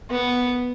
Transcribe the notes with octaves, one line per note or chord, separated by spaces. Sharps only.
B3